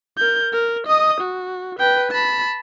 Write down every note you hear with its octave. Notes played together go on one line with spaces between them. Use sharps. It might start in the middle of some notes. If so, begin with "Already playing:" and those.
A#4 G6
A#4
D#5 D#6
F#4
B4 G5
A5 B5